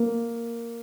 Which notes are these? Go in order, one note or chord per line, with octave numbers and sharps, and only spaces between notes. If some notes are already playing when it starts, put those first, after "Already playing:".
Already playing: A#3